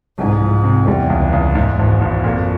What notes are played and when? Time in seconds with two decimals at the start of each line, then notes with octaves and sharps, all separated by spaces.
0.18 C2 G#2
0.41 F3
0.64 C3
0.88 E2 G3
1.10 C#2
1.33 C#2
1.55 E2 G#2
1.79 G#1
2.01 G#1
2.24 F2 A#2